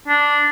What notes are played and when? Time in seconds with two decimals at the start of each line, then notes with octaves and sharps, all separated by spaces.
0.08 D4